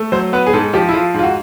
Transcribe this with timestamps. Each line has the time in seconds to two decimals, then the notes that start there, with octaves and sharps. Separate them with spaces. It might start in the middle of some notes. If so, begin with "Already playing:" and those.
Already playing: A3
0.12 F#3 C5
0.33 B3 B4
0.46 G#4
0.53 G#2 A4
0.73 F3 G4
0.89 E4
0.94 F3 F4
1.14 G#2 F4
1.23 F#4